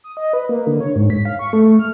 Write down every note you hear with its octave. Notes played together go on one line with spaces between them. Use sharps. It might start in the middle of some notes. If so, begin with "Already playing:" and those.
D#6
D#5
B4
A#3
D3
C#5
G#2
B6
F5
C#6
A3
F6